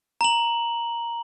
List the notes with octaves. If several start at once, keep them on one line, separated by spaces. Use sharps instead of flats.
A#5 F#7